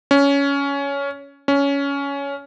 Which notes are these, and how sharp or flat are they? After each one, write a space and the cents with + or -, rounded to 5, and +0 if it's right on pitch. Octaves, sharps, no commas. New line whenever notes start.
C#4 +15
C#4 +15